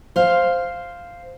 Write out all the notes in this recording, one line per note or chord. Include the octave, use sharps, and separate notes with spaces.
C5 F5